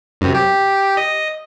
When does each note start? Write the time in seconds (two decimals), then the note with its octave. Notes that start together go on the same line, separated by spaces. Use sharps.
0.21 F#2 C3
0.35 G4
0.97 D#5